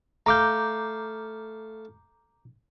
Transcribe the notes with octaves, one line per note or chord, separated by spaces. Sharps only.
A3 F5 A#5 D6 G6